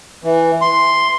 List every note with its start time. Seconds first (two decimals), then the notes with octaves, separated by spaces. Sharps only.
0.24 E3
0.61 C6